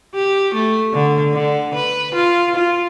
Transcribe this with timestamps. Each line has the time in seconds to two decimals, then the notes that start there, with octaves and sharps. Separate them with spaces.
0.15 G4
0.54 A3
0.93 D3
1.33 D3
1.75 B4
2.15 F4
2.55 F4